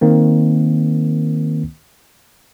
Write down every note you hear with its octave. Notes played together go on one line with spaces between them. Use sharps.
D#3 A#3 C4